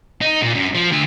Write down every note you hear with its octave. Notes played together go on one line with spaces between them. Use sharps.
D#4
A#2
F#2
F3
D3 E5